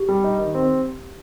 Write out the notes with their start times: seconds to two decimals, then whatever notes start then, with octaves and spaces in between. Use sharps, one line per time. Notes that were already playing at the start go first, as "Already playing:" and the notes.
Already playing: G4
0.09 G3
0.24 D#4
0.39 D#3
0.54 C4